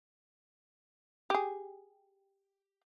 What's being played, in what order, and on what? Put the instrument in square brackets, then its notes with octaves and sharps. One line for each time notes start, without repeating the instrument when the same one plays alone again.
[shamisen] G4 G#4